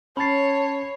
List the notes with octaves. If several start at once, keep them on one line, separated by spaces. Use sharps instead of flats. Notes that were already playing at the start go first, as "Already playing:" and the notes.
C#4 C#5 A5 B5 A6 C7